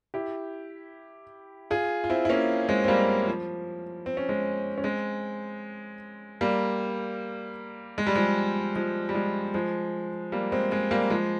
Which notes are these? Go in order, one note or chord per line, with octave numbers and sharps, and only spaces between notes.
E4 G4
F4 G#4
F4
C4 E4
E4
A#3 C#4
G#3 C4
C4
G3 A#3
F3
C4
C#4
G#3 C4
C#4
G#3 C4
G3 A#3
G#3
G3
F3 G#3
F3 G#3
G3
F3 G#3
F3 G#3
G3 A#3
G#3 C4
G#3 C4
G3 A#3
F3 G#3